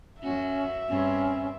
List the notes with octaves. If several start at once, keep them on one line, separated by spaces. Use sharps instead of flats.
F#2 C#4 F#4 E5
G2 C4 C#4